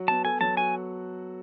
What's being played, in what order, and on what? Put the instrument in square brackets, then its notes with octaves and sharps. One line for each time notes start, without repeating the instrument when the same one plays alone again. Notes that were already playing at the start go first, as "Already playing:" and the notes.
Already playing: [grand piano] F#3 F#4
[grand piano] B3 [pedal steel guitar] A5
[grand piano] A4 [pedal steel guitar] G#5
[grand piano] F#3 [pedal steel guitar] A5
[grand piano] F#4 [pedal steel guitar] G#5